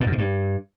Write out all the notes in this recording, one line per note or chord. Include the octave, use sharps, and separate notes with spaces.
A#2
F#2
B2
G2